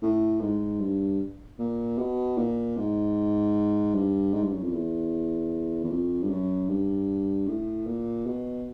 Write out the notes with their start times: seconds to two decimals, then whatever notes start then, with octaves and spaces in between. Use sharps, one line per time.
0.02 A2
0.41 G#2
0.81 G2
1.59 A#2
1.98 B2
2.38 A#2
2.77 G#2
3.95 G2
4.34 G#2
4.43 G2
4.53 F#2
4.63 F2
4.72 E2
5.84 E2
5.90 F2
6.23 G2
6.30 F#2
6.69 G2
7.48 A2
7.86 A#2
8.26 B2